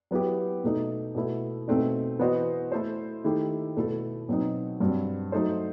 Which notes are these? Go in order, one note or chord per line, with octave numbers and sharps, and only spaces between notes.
F#3 B3 E4 G4
B2 A3 D#4
B2 A3 E4
B2 A3 C4 D#4
E3 B3 F#4 C5 D#5
A3 E4 A4 C5
D#3 A3 E4 G4
B2 A3 E4 A4
B2 F#3 C4 D#4
G2 F#3 C4
F#3 A3 D#4 A4 C5